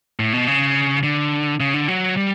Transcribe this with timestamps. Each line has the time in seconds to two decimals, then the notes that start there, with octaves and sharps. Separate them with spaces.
0.19 A2
0.33 B2
0.47 C#3
1.03 D3
1.60 C#3
1.74 D3
1.88 F#3
2.17 G3